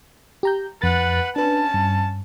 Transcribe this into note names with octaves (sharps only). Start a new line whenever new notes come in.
G4 A#5 G6
F2 B4 F#5 A6
C#4 D4 B4 A5
G2